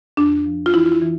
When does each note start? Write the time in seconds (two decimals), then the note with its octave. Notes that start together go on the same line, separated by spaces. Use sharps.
0.17 F2 D4
0.46 F3
0.66 F4
0.74 E3 E4
0.86 F4
0.92 E4
1.02 E3